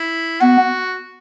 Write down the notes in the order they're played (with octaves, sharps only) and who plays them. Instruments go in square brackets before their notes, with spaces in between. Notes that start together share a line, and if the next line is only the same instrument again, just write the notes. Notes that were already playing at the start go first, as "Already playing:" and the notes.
Already playing: [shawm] E4
[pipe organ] B3 [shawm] F#4